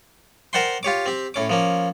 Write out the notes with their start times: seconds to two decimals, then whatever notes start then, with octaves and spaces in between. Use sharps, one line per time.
0.53 A#4 C5 D5 F#5 G5 C6
0.83 F4 G4 C#5 D6
1.06 C4 G4
1.34 A2 C#4 D6
1.49 F3 A#3 C#4